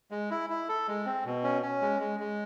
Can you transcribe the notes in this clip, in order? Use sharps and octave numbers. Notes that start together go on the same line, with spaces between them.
G#3
E4
E4
A4
G#3
C4
B2
C#4
C#4
G#3
G#3
G#3